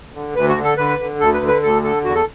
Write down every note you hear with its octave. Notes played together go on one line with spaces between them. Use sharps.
D3
D2 B4
F#4
D3
A4
D3 B4
D3
D2 A4
B4
D3
B4
D2 A4
D3 A4
E2 F#4
A4